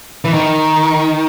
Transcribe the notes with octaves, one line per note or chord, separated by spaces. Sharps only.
E3
D#3